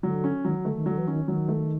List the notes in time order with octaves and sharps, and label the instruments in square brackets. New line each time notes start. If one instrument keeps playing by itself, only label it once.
[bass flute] D3 [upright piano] F#3
[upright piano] C#4
[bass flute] D#3 [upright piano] F#3
[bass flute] D3 [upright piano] A3
[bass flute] D#3
[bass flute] D3 [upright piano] F#3
[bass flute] E3
[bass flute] D#3 [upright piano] C#4
[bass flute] D#3 [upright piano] F#3
[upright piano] A3